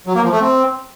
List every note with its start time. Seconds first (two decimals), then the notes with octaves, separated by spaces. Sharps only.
0.07 F#3
0.15 A#3
0.24 F3
0.32 A3
0.41 C4